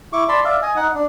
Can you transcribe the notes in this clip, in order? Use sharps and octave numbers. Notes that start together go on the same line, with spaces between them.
E4 C#6 D6
D5 A5 B5 C6
D5 E5 F5
D#5 G#5
D#4 F#5
D4